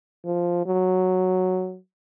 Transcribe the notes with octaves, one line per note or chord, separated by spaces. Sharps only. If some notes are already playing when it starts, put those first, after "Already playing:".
F3
F#3